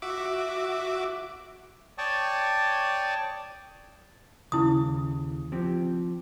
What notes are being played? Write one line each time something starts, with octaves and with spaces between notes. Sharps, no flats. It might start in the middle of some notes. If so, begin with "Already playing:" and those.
F#4 E5 D6
C#5 D5 G5 A5 C#6 D#6
D#2 C#3 E4 D#6
F3 C4 G4